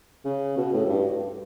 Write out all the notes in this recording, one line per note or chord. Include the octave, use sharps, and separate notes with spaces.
C#3
B2
A2
F#2
G2